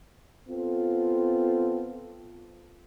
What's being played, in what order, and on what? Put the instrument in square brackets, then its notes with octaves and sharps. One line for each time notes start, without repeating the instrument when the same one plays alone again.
[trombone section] B3 C4 F4 A4